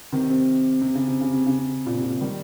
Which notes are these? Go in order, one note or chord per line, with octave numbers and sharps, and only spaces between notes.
C3 D#3
C3
C3
C#3
C3
C#3
C3
C#3
C3
A#2
C3
A#2
D#3 G3